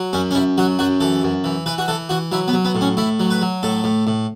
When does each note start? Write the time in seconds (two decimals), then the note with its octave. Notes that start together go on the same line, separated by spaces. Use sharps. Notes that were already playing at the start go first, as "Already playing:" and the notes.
Already playing: F#3
0.13 F#2 C#4
0.31 C#4
0.35 F#2 E4
0.58 F#3 F#4
0.79 F#2 F#4
1.00 E3 A4
1.23 F#2
1.44 E3
1.66 E3 B4
1.78 F#4
1.88 E3 A4
2.09 E3 F#4
2.32 F#3 E4
2.48 B3
2.53 F#3
2.65 B3
2.75 A2
2.81 C#4
2.97 A2 E4
3.20 F#3
3.30 B4
3.41 F#3
3.63 A2 A4
3.84 A2
4.07 A2